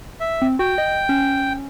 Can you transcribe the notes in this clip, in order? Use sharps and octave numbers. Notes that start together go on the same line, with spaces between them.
E5
C4
F#4 G5
D#5
C#4